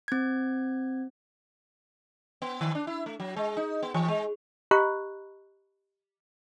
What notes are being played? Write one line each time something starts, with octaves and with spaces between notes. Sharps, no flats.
C4 G#6
B3
D#3
D4
E4
A3
F#3
G#3
D#4
B3
E3
G#3
G4 D#5 A#5 B5 C#6 F#6